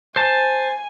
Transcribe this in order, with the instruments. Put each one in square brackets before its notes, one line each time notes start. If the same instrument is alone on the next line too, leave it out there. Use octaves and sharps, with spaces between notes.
[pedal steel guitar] C5 A5 [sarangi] G#5